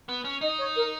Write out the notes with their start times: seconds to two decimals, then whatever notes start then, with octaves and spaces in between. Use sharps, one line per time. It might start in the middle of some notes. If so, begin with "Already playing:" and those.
0.09 B3
0.25 C#4
0.41 D#4 D#5
0.58 C#5
0.75 A#4